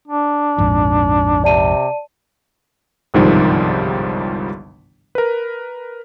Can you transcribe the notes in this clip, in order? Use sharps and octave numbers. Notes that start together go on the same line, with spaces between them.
D4
A#1 F2 G#2
C3 D5 A5 D#7
G1 C2 G#2 D#3 F3 G3
A#4 B4